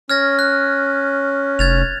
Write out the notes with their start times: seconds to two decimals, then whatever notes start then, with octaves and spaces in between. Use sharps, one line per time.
0.10 C#4 F6 G#6 A#6
0.39 F#6
1.59 F1 G#6 A6 F7